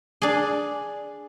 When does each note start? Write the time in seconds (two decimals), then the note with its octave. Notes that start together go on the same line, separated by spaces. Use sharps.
0.22 D4 G#4